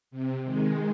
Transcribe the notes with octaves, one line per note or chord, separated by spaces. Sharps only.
C3
D#3 G#3